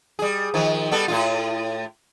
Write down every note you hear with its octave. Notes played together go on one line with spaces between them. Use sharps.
G3 G#4
D#3 F3
G3 B3 A4
A2 C#3 F4